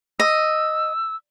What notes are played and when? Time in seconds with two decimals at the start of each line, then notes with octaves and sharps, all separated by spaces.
0.20 D#5 E6